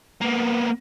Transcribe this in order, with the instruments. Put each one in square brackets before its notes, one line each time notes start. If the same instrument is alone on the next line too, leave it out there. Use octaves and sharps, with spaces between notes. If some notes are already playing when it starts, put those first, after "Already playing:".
[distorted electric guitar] A#3 B3